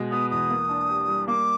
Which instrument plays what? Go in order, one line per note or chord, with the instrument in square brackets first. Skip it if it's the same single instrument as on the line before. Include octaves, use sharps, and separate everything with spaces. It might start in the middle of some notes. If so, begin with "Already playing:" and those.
Already playing: [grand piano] B2 G#3
[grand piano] B3 [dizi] D#6
[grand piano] E2 [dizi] D#6
[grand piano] A#3
D4
G4
G3
[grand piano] A#3 [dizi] D6